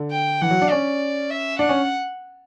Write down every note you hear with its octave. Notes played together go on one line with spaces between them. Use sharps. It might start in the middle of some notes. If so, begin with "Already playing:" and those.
Already playing: D3
G5
E3 F#5
F#3
D4
C#4 D5
E5
D4 F#5
C#4